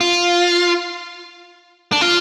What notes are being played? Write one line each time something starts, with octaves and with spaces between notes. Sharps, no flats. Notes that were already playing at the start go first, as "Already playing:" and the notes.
F4
D4
F4